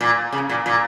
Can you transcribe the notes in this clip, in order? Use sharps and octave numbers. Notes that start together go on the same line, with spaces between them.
A#2
C#3
A#2
A#2